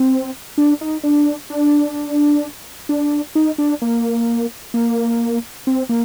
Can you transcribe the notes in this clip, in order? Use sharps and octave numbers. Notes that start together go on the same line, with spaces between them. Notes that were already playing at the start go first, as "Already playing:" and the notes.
Already playing: C4
D4
D#4
D4
D4
D4
D#4
D4
A#3
A#3
C4
A#3